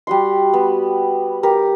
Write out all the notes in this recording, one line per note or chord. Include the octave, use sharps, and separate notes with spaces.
G3 F#4 C6
B3
G4 A#4